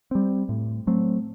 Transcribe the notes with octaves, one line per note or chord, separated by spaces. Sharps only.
G3 C4
A2
F#3 A3 C4